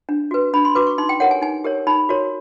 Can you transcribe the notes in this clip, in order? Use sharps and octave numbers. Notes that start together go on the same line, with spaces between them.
D4
F#4 B4
D4 B5
C6
F#4 B4 D6
C#6
D#4 C6
G5
G4 A#4 C#5 F#5
G#5
D#4 G#5
G4 A#4 C#5
D#4 B5
F#4 A#4 C#5